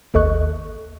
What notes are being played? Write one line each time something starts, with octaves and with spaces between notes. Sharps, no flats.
G#1 D#2 A4 D#5 C#6 F#6